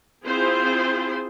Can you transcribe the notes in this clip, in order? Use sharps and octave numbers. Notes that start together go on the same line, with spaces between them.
C4 E4 F4 G#4 C5